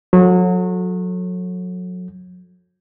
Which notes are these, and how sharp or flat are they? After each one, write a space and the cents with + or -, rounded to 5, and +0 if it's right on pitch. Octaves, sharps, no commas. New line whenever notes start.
F#3 -30 A4 +0